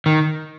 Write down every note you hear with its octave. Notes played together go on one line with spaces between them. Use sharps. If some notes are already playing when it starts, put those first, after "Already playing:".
D#3